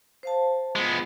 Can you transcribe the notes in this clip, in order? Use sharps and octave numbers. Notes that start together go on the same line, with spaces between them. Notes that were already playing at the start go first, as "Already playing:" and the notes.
C5 F5 A5
G#3 B3 F4